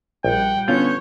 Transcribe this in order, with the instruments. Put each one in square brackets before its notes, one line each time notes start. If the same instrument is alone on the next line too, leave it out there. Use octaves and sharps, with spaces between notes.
[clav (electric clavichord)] A#1 [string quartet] G3 F#5 [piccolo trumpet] G5
[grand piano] D3 B3 C#4 [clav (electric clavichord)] F4 F5 [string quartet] C#5 [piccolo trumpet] G6